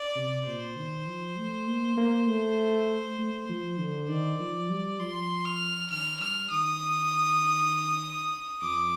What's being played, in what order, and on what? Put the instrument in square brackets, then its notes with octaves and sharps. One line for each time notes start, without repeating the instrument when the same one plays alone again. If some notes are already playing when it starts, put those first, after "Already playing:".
Already playing: [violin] D5
[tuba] C3
[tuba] A#2 [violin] C5
[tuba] D#3
F3
A3
A#3
A#3
A3
A3
F3
D3
[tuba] D#3 [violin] D5
[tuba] F3
G3
[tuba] F3 [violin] C6
[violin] F6
[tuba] D#3 [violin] F6
[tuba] G3 [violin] F6
[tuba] D#3 [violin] D#6
[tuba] F2 [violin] D6